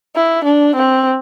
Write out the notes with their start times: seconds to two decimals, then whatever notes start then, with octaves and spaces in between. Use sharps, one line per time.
0.16 E4
0.45 D4
0.76 C4